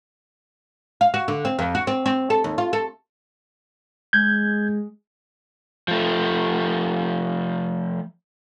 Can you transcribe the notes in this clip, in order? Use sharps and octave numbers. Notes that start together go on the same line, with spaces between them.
F5
F#4
D3
C4
F2
F#4
C4
C4
A4
D#2
F4
A4
G#3 G6 G#6
F3 A3